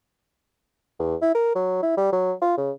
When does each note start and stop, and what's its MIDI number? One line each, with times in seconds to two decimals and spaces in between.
0.99 1.16 40
1.22 1.34 64
1.35 1.53 70
1.55 1.78 54
1.83 1.95 64
1.97 2.10 55
2.12 2.33 54
2.42 2.55 65
2.57 2.71 49